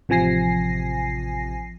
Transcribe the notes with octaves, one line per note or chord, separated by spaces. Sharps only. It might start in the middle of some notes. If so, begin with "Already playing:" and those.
A1 C3 F3 G#5 A#6 C7